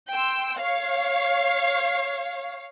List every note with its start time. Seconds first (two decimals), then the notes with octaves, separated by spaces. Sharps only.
0.11 G5 C6 E6
0.60 C#5 F5 C7